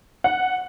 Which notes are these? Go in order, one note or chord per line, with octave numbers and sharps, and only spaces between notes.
F#5